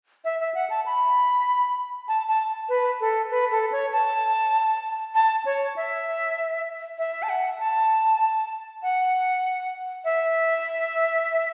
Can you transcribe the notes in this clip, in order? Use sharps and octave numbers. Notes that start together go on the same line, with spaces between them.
E5
E5
F#5
A5
B5
A5
A5
B4
A4
B4
A4
C#5
A5
A5
C#5
E5
E5
A5
F#5
A5
F#5
E5